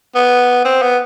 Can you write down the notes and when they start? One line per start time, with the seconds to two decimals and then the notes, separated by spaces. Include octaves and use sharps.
0.15 B3
0.65 C4
0.82 B3